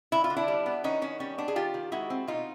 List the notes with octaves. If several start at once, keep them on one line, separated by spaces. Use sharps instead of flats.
D3 E4
F4
D3
D4 E4
G3
B3
D#3 C#4 D#4
D#3 C#4
G3 C#4
B3 D4
G#4
D#3 F4 G4
D#3
G#3 E4 F#4
C4
B2 D#4 F4